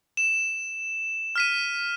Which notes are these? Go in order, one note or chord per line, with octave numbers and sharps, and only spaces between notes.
E7
F6 B6 D#7